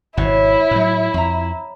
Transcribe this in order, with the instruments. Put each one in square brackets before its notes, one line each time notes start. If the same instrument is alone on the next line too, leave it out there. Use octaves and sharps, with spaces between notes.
[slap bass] G#1 B2 [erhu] E4 [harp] C5 C#5 F#6
[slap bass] A2 F#3
[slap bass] F2 [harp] A#5 B5